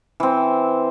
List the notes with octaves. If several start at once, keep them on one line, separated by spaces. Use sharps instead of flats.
E3 C4